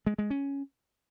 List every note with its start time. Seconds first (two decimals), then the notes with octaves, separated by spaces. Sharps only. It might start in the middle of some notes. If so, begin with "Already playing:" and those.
0.07 G#3
0.18 G#3
0.30 C#4